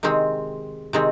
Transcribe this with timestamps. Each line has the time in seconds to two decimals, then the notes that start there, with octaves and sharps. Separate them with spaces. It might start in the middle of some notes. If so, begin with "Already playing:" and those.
0.03 C3 D#3 G#3 C4
0.93 C3 D#3 G#3 C4